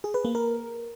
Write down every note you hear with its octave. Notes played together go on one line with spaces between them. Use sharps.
G#4
B4
A#3
A#4